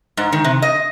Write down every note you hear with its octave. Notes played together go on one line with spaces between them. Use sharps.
G#2
D#3
C3
D#5